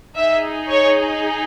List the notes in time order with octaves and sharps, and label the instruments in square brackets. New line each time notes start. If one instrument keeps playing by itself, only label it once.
[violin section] D#4 G#4 E5
C#5